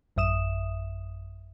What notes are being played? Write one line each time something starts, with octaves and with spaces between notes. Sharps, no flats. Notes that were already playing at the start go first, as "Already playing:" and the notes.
A1 F#2 E5 D#6 E7